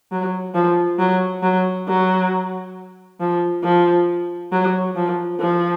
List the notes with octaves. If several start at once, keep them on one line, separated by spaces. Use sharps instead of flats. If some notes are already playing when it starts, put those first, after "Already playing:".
F#3
F3
F#3
F#3
F#3
F3
F3
F#3
F3
F3